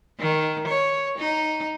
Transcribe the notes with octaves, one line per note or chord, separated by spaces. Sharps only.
D#3
C#5
D#4